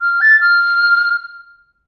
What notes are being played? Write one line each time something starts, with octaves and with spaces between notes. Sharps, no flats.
F6
A6
F6